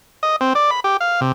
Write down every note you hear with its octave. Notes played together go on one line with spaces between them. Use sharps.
D#5
C4
D5
B5
G4
F5
C3